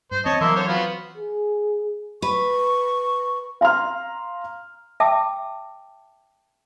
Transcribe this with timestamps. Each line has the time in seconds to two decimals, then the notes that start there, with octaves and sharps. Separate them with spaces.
0.11 G2 C5
0.25 E2 C4 C#5 D#5 A5
0.41 E3 F#3 A#3 C4 E5 C6
0.56 D3 C5 C#5
0.68 B3 F4 F#4
1.17 G#4
2.22 B4 C#6
3.61 F5 A#5 C6 F6
5.00 E5 G5 A5 D6 E6